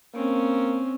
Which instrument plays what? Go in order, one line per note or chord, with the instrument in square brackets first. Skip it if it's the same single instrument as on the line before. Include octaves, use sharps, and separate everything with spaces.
[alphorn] A#3 [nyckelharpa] C4 C#4